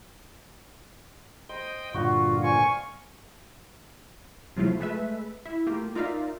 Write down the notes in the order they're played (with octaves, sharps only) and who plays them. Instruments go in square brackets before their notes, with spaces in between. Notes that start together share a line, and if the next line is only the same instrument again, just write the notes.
[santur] C5 [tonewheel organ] D#5 G5
[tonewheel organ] G2 A#2 D3 [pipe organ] F4 [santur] F#4 C#6
[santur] C5 D5 F5 [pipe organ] G#5 C#6
[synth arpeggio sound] C3 F3 F#3 A3 E4 F4
G#3 A3 B4 E5
E4
A3 A#3 F4 G4
D#4 F4 A#4 D5 E5 F5